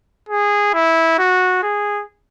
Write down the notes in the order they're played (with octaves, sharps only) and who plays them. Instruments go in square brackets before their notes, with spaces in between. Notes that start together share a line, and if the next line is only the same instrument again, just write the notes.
[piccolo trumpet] G#4
E4
F#4
G#4